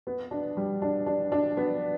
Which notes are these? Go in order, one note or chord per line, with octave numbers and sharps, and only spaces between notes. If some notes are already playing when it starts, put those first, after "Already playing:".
B3
D4
G3
D4
D4
D4
B3